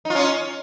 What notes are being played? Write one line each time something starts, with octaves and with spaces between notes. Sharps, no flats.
C#4 D#4 F4